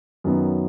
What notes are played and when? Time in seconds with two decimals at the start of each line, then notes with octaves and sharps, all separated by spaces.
0.24 F#2 D#3 F#3 B3